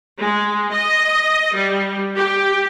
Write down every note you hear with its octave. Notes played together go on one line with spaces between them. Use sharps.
G#3
D#5
G3
G4